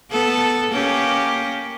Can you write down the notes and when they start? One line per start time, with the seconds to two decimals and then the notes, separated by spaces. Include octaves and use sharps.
0.11 B3 A4
0.71 A#3 C#4 G4